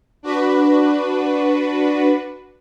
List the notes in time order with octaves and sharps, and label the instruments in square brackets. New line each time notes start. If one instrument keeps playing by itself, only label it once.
[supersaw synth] D4 F#4 B4